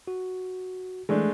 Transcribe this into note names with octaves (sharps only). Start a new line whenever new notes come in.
F#4
E3 G#3 A3 D4